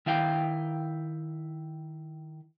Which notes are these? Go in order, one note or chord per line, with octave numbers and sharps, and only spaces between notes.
D#3 E4 F5 G5